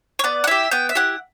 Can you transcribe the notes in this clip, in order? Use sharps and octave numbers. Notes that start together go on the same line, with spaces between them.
C#5
B3 D5
F#5
E4 G4 E5
B3 G5
E5
E4 G4 F#5